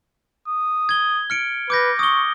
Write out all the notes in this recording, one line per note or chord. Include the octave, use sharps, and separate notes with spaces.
D#6
G#6 G7
F6 C#7 D7
B4 D6 G6 A#6
C#6 D#6 G7